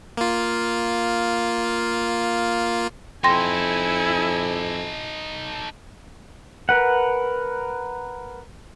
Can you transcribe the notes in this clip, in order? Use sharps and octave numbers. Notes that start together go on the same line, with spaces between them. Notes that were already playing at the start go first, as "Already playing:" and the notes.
A#3 F4
F2 D#4 E4 A4 G5 G#5 C6 A#6
A#4 B4 F#5